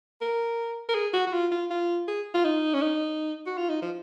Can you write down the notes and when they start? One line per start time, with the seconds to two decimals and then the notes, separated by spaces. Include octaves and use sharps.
0.21 A#4
0.89 A#4
0.95 G#4
1.13 F#4
1.27 F#4
1.33 F4
1.51 F4
1.70 F4
2.08 G#4
2.34 F4
2.45 D#4
2.74 C#4
2.82 D#4
3.46 F#4
3.58 F4
3.70 D#4
3.82 F3